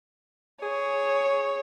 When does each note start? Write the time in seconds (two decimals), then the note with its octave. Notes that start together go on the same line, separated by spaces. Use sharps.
0.63 G#4 C#5